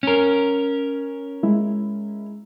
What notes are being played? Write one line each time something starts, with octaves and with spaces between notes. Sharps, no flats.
C#4 A#4
G#3 E4